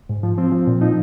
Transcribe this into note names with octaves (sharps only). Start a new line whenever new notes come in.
G#2
F3
F3 C4
F3
A#2
F3 D#4